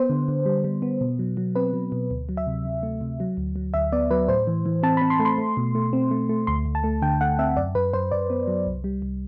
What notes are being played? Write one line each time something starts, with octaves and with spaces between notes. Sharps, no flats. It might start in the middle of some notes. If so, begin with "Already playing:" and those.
Already playing: B3 C5
D3
D3
G3
G3
B3
B2
F#3
F#3
C4 B4
F#3
B2
D2
F#3
E5
C3
C3
A3
C3
F#3
D2
F#3
D2 E5
B3 D5
F#3 B4
A2 C5
E3
E3
C4 A5
B5
C4
C6
A3
C6
A3
B2
A3
C4
A3
A3
D2 C6
D2
A5
A3
D3 G5
A3 F#5
C4 E5
F#2 D5
F#2 B4
F#2 C5
F#2 D5
B3
F#3
C2
G3
C2